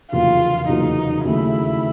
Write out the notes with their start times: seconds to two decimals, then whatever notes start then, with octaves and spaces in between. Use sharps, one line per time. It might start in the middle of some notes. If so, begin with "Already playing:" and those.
0.12 F1 E2 C#3 F#3 A#3 F4
0.68 F1 E2 C#3 F#3 A#3 D#4
1.25 D#2 C#3 F#3 A3 E4